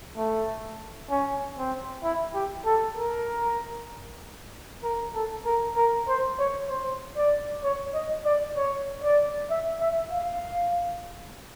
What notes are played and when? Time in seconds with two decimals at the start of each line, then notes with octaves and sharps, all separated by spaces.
0.17 A3
1.10 C#4
1.58 C4
2.04 E4
2.34 G4
2.66 A4
2.97 A#4
4.83 A#4
5.15 A4
5.46 A#4
5.77 A#4
6.08 C5
6.39 C#5
6.70 C5
7.17 D5
7.64 C#5
7.94 D#5
8.25 D5
8.57 C#5
9.03 D5
9.50 E5
9.80 E5
10.11 F5